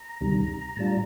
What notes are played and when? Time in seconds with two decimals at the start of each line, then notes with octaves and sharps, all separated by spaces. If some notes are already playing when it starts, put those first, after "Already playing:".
Already playing: A#5
0.21 D2 C3 D#3 G3
0.77 A2 G3 D4 F4 A5
0.88 A#5